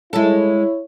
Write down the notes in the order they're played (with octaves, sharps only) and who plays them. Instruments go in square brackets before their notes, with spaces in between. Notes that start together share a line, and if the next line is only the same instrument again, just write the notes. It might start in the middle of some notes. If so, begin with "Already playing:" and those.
[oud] G#3 A4 [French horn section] E4 C#5